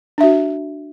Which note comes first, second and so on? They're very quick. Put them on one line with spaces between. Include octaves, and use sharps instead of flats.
D4 E5 F#4